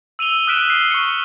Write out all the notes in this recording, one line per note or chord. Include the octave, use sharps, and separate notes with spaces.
E6 D#7 F7 G7
D#6 F6 F#6 B6 D7 E7
E6 C7 G7
C#6 C#7